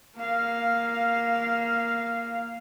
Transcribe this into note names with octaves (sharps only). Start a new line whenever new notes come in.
A#3 F5